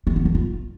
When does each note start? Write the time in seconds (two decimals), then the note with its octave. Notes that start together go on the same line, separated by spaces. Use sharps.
0.07 A3
0.16 B3
0.25 D4
0.35 F4